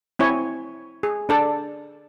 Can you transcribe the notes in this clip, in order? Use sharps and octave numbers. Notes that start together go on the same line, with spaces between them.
C4 E4 C#5 G#5
G#4
D4 A4 D5